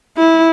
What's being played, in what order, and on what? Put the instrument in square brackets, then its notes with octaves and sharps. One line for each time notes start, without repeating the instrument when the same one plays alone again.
[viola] E4